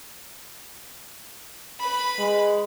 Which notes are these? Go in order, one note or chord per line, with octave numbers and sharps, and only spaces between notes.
B4 B5
G#3